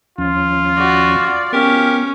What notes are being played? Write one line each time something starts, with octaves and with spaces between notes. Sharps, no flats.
D#2 F3 C#4 F4
F#4 D5
F3 B3 C#4 G4 A#4